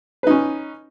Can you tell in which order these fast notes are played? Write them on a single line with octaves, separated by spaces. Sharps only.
B4 D#4 C#4